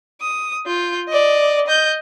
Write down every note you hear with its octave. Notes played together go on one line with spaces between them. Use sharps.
D#6
F4 G6
D5 D#5
D#5 G6